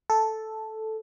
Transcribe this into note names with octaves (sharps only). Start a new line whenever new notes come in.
A4